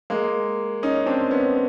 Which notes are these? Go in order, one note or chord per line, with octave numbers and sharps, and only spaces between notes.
G#3 A#3
C#4 D#4
C4 D4
B3 C#4